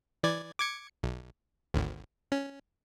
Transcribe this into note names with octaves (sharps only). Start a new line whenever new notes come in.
E3 D5 G#6
D6 G#6 C#7
B1
G#1 D2
C#4